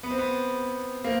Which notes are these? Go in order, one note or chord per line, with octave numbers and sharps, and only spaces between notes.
B3
C4
B3
A#3 C4